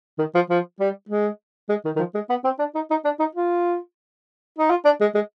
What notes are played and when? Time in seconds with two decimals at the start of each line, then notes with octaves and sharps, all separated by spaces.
0.18 D#3
0.35 F3
0.50 F3
0.80 G3
1.09 G#3
1.69 G#3
1.85 D#3
1.96 D#3
1.99 F3
2.14 G#3
2.29 B3
2.44 C4
2.59 D4
2.75 D#4
2.90 D#4
3.05 D4
3.20 D#4
3.35 F4
4.58 D#4
4.70 F4
4.85 D4
5.01 G#3
5.15 G#3